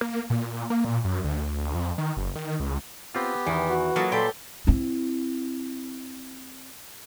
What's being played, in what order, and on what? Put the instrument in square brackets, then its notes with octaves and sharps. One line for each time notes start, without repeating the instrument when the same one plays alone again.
[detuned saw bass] A#3
A#2
A#3
A#2
F#2
D2
F2
D#3
F#1
D#3
C#2
[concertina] B3 G4 [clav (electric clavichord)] C4 F4
[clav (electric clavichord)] E2 D#3 [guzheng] E3
[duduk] F#4
[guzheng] F#3 [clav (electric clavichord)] A#3 F4 A4 [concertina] D#5 F#5 A5
[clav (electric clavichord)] A#2 [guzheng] G4 G5 [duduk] A4 [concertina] D5 B5 C6
[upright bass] C4 E4